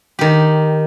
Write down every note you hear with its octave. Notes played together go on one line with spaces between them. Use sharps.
D#3 G4